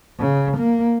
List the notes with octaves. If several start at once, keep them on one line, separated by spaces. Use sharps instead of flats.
C#3
A#3